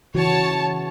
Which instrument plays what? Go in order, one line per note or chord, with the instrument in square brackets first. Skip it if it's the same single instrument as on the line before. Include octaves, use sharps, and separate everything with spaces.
[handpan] C#3 E3 F#4 [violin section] C#5 A5